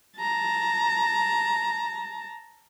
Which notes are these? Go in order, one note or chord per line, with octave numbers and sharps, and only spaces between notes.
A5 A#5